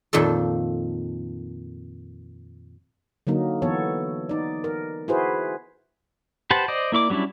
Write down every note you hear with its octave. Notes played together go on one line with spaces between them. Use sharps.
F2 A#2 D#3 F3 A4
D3 F#3 A#3 D#4
E3 B3 A4 C#5
D#4 D5
A#4
E4 F#4 G#4 B4 C5
G4 B4 C5 F#5 A5
C5 D5 D#5
A#3 E4 D5 D6
F#3 G3 C#4 D4 E4